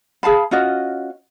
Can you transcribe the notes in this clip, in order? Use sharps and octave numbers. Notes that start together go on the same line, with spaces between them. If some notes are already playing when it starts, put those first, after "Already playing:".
G#4 F5 A5 B5
C#4 F4 F#4 D#5